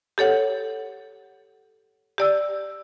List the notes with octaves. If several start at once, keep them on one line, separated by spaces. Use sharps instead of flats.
G4 A4 C#5 F#5
G4 D5 E6